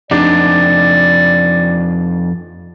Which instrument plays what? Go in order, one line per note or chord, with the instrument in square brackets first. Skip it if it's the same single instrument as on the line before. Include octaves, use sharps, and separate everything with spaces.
[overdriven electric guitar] F2 D#4 [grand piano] D4 [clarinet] D5